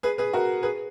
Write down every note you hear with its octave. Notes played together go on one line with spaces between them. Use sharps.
G#4 B4
G#4 B4
F#4 A#4
G#4 B4